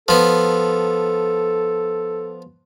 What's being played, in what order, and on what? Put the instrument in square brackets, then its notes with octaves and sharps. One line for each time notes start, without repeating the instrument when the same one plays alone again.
[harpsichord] F3 B3 [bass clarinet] A4